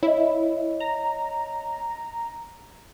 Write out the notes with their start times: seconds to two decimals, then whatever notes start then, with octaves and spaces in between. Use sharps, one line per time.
0.03 E4 C#5 D#5
0.80 A#5